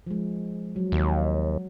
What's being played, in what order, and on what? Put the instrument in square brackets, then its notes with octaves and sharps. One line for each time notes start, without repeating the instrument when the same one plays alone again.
[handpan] F3 G#3
F#3
[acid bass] D#2